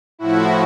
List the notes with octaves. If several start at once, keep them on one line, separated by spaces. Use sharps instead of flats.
A2 F3 E4 F#4